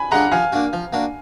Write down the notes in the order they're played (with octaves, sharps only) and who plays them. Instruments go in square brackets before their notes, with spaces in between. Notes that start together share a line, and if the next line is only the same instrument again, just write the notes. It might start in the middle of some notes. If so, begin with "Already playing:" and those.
Already playing: [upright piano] G#5 B5
[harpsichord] G#3 D4 F4 [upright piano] F#5 A#5
[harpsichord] F3 [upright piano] F5 G#5
[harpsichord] A#3 D4 F#4
F3
A#3 D4 F#4